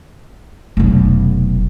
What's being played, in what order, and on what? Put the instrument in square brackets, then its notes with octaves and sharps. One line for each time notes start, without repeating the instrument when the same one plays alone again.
[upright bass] F1 B1